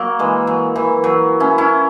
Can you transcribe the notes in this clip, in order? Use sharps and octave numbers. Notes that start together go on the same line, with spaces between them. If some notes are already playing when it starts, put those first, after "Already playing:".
Already playing: F#3 A#3
E3 G#3
F#3
E3
F#3
C#4 E4
C#4 E4